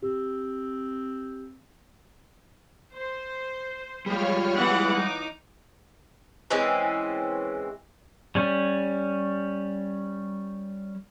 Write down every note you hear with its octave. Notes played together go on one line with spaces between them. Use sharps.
C4 G4
C5
G3 G#3 F4 G4 C#5 F6
E3 B3 F#5 D6
D#4
E3 G#3 C4 C#4
G3 C#4